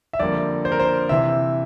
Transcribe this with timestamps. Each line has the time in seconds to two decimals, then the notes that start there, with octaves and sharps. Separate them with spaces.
0.13 E5
0.19 F2 D3 G3 A#3 D5
0.65 C5
0.72 A#4
0.80 C5
1.09 C3 E3 E5